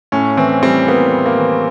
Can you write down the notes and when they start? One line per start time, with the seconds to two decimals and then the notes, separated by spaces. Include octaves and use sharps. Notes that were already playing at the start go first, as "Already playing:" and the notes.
0.12 A2 C#4
0.37 E3 C4
0.63 G3 C4
0.88 A#3 B3
1.13 A2
1.26 A#3
1.38 E3